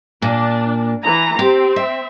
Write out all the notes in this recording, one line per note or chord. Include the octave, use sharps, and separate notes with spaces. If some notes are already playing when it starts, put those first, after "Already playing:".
A#2 D4
E3 A#5
C4 G4
E5